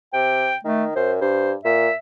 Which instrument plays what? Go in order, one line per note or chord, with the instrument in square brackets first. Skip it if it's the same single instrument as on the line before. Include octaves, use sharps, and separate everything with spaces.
[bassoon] C3 [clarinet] G5
[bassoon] D#3 [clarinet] A3
[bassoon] F#2 [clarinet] C5
[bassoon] G2 [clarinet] C5
[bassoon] A#2 [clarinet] E5